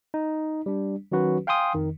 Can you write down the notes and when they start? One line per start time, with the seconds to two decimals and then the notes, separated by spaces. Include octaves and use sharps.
0.14 D#4
0.66 G3 D4
1.12 D#3 F#3 C#4 F#4 B4
1.47 F5 G5 G#5 C6 D#6
1.75 F2 D#3